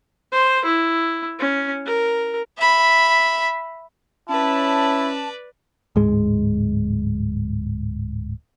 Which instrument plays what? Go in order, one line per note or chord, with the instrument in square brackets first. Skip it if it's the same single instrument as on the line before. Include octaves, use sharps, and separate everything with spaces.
[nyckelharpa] C5
E4
C#4
A#4
[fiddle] E5 B5
[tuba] C#4 [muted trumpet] E4 [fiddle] B4 D5 [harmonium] A5
[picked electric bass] D1 G#2 G#3